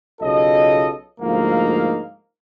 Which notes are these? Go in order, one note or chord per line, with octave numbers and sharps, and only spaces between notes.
B1 C#3 F4 A4 D#5
D2 G#2 F3 A#3 D#4 F5